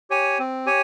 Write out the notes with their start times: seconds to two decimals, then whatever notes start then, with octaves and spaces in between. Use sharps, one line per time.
0.10 G4 C#5 G#5
0.39 C4
0.66 G4 C#5 G#5